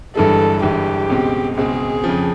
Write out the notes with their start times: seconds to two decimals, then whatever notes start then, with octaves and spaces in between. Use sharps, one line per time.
0.15 G1 G2 E3 G#3 A4
0.62 G1 G2 E3 G#3 G4
1.10 C#2 B2 G#3 C4
1.56 C#2 B2 G#3 C4 G#4
2.04 F2 C#3 F3